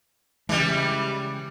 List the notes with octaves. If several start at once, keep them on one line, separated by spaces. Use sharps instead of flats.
C#3 E3 G3 G#3